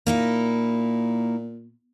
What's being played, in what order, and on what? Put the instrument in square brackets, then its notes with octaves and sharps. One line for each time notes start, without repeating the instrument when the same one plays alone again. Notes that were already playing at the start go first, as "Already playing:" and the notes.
[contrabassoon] A#2 [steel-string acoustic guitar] A#3 D#4 E4